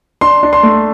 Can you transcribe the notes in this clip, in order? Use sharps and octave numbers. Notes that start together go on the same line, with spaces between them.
D4 C6
D4
C6
A3